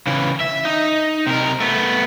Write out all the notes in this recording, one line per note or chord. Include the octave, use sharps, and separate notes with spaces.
C#3 E3
E5
D#4
C3 A#4
A3 B3